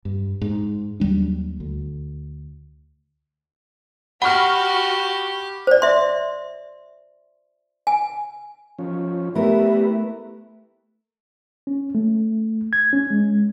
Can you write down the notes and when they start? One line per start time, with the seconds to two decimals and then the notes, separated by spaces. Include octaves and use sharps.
0.05 G2
0.41 G#2
1.00 D#2 F#3 G3 D4
1.60 D2
4.22 F#4 G4 F#5 B5 C#6 F6
5.67 C5 D5
5.82 E5 C6
7.87 G#5
8.79 F3 C#4
9.35 A3 B3 E4 G4 A#4 B4 E5
11.67 C#4
11.95 A3
12.73 G#6
12.93 C#4
13.11 G#3